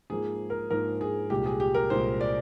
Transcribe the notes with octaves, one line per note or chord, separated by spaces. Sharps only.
G#2 F3 A#3 G#4
A#4
G#2 F3 A#3 A#4
G#4
C2 A#2 G#3 G4
G#4
G4
A#4
C2 A#2 G#3 C5
D5